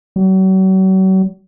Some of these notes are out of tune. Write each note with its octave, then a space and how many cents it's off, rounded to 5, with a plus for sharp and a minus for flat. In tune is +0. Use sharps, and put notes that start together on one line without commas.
F#3 +40